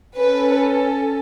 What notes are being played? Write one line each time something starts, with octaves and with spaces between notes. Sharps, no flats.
C#4 A4 B4